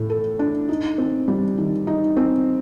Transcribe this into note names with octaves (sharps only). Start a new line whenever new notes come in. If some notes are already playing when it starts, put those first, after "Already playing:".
Already playing: A2 A3
A4
D4
D#4
C4
G3
D#3
D#4
C4